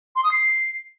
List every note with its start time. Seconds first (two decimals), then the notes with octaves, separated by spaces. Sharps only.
0.16 C6
0.24 D#6
0.31 C7